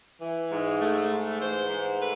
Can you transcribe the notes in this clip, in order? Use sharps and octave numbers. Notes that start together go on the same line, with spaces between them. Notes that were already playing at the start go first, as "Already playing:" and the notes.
E3
G#2
A3
G#2
E3 C5
G#2
A3 B4